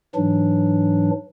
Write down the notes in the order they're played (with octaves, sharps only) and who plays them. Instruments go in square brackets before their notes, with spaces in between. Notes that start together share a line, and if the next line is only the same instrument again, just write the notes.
[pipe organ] G#2 E3 F#3 D4